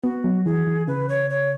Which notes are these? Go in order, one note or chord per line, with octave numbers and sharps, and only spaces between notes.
B3 F#4
F#3
E3 G#4
E3
C#3 B4
C#5
C#5